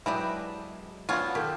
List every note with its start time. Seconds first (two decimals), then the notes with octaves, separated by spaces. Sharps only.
0.06 D3 F#3 G#3 E4 G4 G#4 B4 D5
1.09 B3 D4 F4 F#4 C#5 G#5
1.35 D#3 G4 A4